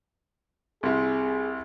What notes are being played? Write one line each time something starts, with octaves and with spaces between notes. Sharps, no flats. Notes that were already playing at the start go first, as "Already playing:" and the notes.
C2 C3 G#4